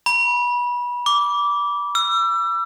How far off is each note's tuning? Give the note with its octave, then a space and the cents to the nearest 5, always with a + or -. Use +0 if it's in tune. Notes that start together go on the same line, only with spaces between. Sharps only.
B5 -25
D6 -15
E6 +35